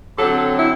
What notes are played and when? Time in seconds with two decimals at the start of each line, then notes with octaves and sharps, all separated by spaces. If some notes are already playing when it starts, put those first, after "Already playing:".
0.17 D3 F#3 C4 A4
0.57 E4